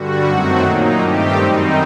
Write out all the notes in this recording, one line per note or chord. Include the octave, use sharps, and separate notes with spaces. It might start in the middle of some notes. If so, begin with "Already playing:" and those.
Already playing: G2 D3 G3 F#4
F#2 D#3 F#3 A3 C4 F#4
A#2 F#3 A#3 D#4
G2 D#3 A3 C4 G4
F#2 D#3 G3 C4 D#4